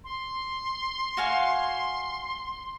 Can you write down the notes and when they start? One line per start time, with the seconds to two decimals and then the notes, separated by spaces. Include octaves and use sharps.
0.04 C6
1.17 F#4 F5 G#5